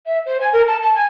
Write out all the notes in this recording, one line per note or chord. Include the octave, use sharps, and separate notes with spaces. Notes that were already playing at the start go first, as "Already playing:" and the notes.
E5
C5
G#5
A#4
A5
A5
G#5